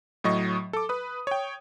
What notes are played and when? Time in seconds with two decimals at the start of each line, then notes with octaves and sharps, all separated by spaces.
0.24 A2 F#3 D#5 C#6
0.73 A4 D6
0.89 B4 D#6
1.27 C#5 G5